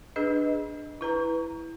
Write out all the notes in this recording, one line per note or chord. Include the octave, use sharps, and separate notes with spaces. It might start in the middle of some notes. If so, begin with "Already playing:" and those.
D4 G#4 B4 D#5
E4 B4 A#5